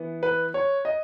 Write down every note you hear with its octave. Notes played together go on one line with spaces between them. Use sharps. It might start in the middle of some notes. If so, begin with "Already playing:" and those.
Already playing: E3 B3
B4
C#5
D#5